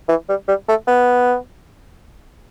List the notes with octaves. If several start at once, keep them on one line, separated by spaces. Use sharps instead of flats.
E3
G3
G3
A3
B3